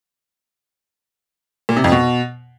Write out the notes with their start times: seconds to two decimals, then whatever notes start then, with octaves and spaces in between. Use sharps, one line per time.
1.69 A#2
1.77 C3
1.84 F2
1.92 B2